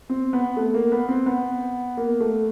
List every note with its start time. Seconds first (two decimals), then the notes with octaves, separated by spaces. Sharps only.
0.09 C4
0.33 B3
0.57 A3
0.74 A#3
0.92 B3
1.09 C4
1.26 B3
1.97 A#3
2.20 A3